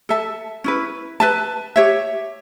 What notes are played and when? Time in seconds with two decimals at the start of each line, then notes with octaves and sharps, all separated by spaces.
0.09 A4 E5 A5
0.64 C#4 E4 B4
1.20 B4 E5 A5
1.76 G4 C#5 E5